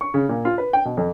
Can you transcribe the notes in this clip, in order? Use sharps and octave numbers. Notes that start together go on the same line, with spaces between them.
C#6
C#3
A#2
F4
B4
G5
B2
F2